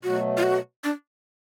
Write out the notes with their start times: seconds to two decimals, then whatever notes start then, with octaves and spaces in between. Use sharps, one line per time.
0.03 B2 F#3 A3 F#4
0.37 F4
0.43 F#4
0.84 D4